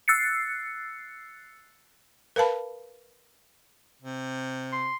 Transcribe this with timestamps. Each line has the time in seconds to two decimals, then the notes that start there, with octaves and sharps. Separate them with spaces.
0.08 E6 F#6 A6 C7 C#7
2.36 A#4 B4 F5 A5 B5
4.02 C3
4.72 C6